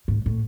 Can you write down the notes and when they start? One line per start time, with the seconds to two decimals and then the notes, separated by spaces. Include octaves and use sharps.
0.08 G#2
0.26 A2